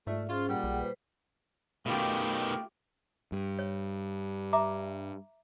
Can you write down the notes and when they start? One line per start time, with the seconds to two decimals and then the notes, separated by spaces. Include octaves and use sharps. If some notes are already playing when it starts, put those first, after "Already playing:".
0.07 G#2 A3 F4 D5 E5
0.29 C#4 F4 G#4 C5
0.49 A#2 G3 G#4 F#5 G5
0.64 B1
0.79 B4 C5
1.86 B2 D#3 A3 F4 G4
3.32 G2
3.59 C#5
4.53 E5 A#5 D6